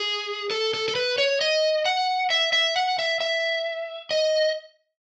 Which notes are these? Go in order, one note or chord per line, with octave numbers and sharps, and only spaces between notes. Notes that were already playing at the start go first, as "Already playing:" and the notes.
Already playing: G#4
A4
A4
A4
B4
C#5
D#5
F#5
E5
E5
F#5
E5
E5
D#5